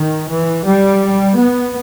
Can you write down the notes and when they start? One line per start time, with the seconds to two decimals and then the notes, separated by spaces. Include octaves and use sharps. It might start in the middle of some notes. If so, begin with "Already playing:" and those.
Already playing: D#3
0.28 E3
0.64 G3
1.35 B3